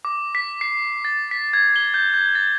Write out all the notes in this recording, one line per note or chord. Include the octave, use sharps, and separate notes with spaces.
D6
B6
C7
A6
B6
G#6
G7
G6
G6
A6